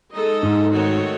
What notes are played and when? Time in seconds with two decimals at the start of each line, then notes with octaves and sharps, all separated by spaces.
0.13 G#3 D#4 A4 D#5
0.42 G#2
0.70 D#3 A3 C4 F#4 C#5